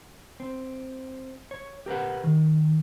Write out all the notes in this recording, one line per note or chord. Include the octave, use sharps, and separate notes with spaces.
C4
C#5
G4 A#4 B4 F#5
D#3